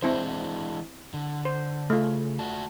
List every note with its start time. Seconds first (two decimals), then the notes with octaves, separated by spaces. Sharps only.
0.02 E3 G#3 C4 D4 E4 C5
1.14 D3
1.45 C5
1.90 C#3 A3 F4
2.39 F#4 D5 A5